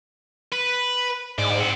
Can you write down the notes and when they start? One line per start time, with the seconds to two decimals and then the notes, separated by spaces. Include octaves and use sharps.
0.53 B4
1.38 D2 G#2 D5
1.60 C4 F#5